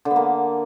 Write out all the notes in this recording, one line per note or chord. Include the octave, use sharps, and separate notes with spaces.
D3
B3
A#3